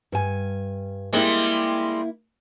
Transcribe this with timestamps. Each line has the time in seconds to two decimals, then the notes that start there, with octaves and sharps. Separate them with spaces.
0.12 G2 G#5
1.13 G3 G#3 A#3 C4 E4